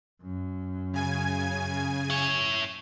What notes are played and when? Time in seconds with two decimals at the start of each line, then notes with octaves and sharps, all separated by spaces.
0.22 F#2
0.94 C#3 G#5 G#6
2.10 E4 C#5